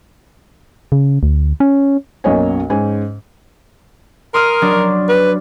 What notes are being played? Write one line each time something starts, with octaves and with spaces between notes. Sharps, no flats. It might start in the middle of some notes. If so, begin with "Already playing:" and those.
C#3
D2
C#4
B1 F#2 A#3 C#5 D#5 G#5
G#2 C#4 G#5
A#4 C6 D#6 F6
F#3 D4
B4